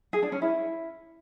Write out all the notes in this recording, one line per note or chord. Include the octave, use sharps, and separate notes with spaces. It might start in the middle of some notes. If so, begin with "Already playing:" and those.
G#4
D4
C#4
E4